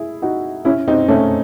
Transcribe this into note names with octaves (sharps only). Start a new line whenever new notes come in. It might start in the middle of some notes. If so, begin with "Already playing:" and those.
Already playing: E4 G#4
D#4 F#4
C#4 E4
C4 D#4
A3 C#4